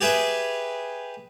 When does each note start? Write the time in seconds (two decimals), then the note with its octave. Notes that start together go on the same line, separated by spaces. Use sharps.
0.01 G4 G#4 B4 E5